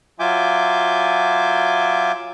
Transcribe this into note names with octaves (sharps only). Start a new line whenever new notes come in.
F#3 F4 E5 G#5 D6 G6